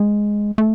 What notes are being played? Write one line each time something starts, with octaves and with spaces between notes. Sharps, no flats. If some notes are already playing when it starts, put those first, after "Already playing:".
Already playing: G#3
A3